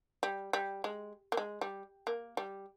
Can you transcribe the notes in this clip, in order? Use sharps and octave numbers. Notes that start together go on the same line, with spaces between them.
G3
G3
G#3
A#3
G#3
G3
A#3
G3